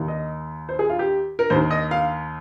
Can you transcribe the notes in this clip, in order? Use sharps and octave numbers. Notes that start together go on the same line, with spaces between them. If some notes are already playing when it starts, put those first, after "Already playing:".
Already playing: D#2 D#3
D#5
C5
G#4
F4
G4
A#4
D#2 D#3 C5
D#5
F5